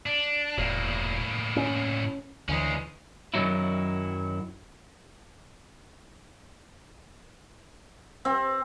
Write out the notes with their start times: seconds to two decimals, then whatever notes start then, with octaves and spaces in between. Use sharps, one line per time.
0.06 D4
0.58 E1 A2 A#3
1.56 C#4
2.49 D2 E3 G#3 C#4
3.34 F#2 D#3 E3 F#3 D#4 E4
8.25 C4